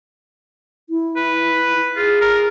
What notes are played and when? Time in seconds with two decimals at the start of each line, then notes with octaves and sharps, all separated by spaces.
0.90 E4
1.16 B4
1.96 F4 G#4
2.21 A#4